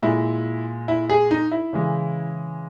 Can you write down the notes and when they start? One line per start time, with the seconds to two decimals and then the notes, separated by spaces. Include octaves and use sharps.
0.02 A#2 G#3 E4
0.88 E4
1.10 G#4
1.31 D#4
1.52 E4
1.73 C#3 E3 G#3